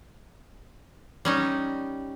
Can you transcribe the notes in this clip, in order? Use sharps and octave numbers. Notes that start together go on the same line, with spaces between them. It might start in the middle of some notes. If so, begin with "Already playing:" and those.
G3 C#4 D#4